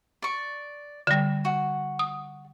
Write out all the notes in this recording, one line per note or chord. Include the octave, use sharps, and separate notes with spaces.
D5 C#6
D3 G3
F#4
D#6